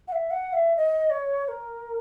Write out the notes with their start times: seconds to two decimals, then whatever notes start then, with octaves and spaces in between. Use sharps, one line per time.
0.08 F#5
0.12 E5
0.31 F#5
0.53 E5
0.76 D#5
1.10 C#5
1.45 C#5
1.48 A#4